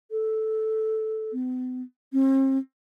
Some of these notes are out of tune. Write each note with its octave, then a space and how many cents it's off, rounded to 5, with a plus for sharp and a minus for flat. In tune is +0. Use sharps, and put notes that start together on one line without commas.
A4 -5
B3 +45
C4 +40